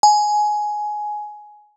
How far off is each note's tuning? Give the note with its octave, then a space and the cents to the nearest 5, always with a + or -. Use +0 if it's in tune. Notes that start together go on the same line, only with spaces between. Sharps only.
G#5 +15